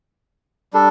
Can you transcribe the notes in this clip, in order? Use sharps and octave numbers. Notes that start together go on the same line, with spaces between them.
G3 D4 A4